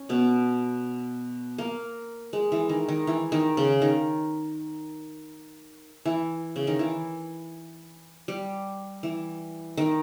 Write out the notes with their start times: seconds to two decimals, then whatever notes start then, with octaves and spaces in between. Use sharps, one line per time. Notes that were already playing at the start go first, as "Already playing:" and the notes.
Already playing: C#4
0.09 B2 B3
1.58 A#3
2.33 G#3
2.52 E3
2.69 D#3
2.89 D#3
3.07 E3
3.32 D#3
3.57 C#3
3.82 D#3
6.06 E3
6.56 C#3
6.67 D#3
6.79 E3
8.28 G3
9.03 E3
9.77 D#3